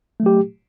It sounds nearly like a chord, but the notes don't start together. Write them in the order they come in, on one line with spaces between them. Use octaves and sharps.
A3 F#3 G4